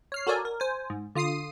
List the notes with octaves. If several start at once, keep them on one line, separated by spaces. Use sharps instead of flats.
C#5 F6 C7
F#4 A4 A#4 C#5 D5 G#5
A#4
C5 G#5
G#2
D3 F4 D#6 C7 D#7